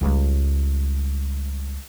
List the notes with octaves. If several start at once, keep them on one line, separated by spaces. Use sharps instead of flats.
C#2 G3